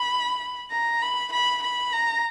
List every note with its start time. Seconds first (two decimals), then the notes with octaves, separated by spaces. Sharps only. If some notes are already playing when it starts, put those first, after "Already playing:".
Already playing: B5
0.71 A#5
1.02 B5
1.32 B5
1.62 B5
1.92 A#5